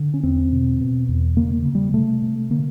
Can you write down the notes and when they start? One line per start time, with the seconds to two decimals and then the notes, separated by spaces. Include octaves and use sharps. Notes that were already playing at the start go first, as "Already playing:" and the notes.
Already playing: D3
0.14 C#4
0.23 E2 C4
0.52 B2
0.80 B2
1.09 E2
1.37 C#3 A#3
1.65 C#3
1.75 G3
1.94 C3 A3
2.22 C3
2.50 D3 A#3